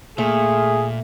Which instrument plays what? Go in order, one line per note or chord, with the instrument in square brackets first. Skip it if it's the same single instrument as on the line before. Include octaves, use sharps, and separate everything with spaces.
[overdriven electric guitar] A#2 [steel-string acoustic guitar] A3 [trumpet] G#4